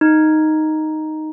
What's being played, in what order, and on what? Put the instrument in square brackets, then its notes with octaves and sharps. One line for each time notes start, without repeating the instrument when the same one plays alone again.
[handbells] D#4